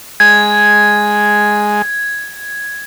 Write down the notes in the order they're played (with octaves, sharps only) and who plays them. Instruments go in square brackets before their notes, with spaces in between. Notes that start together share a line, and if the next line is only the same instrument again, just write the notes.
[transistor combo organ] G#3 [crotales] G#6